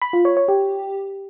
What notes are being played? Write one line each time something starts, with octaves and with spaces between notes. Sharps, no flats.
B5
F4
C#5
C#5
G4